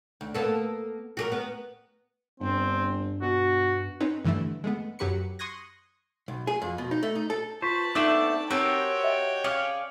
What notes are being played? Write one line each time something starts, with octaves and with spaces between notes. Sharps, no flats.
D2
A#3 B3 A4
F#4 G4 A#4
B3
G1 G2 C4
B2 F#4
C4 C#4 D#4 B4 C#5
G2 D3 E3 A3 E4
G#3 A3 B3
F#2 F#3 G4 B4 C#6 C#7
C6 C#6 D#6 F#6 G#6 A#6
B1
G#4
F2
B2
D#4
A3
D#4
A4
F4 B4 C5 A5 C#6 B6
A3 B3 C4 D4 D#4 D5 E7 F#7
C4 F#4 G4 A#4 C#5 G5 A5
D#5 E5
C#4 G#4 D5 F5 C#7